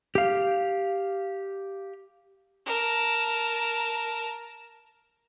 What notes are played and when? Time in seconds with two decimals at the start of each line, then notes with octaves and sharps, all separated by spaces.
0.15 G4 F5
2.66 A#4 A5